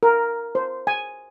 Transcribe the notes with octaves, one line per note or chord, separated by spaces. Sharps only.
A#4
C5
G#5